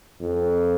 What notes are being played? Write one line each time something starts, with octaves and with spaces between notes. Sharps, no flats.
F2